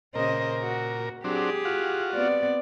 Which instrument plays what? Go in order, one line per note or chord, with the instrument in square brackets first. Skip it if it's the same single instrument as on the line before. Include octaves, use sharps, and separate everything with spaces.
[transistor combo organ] A#2 A#4 [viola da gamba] C#3 C5 D#5
[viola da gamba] F#4
[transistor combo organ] F#3 C4 D4 [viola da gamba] G4 G#4
[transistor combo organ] F4 F#4
[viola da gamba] B3 C4 D5